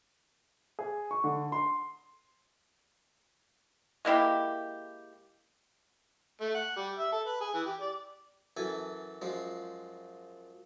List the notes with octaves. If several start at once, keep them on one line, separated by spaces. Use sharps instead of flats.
G#4
C#6
D3
C6
G#3 A#3 E4 G4
A3
F#5
G3
E5
A4
B4
G#4
E3
G4
D5
F#2 E3 A4 G#5
F#2 F3 G#3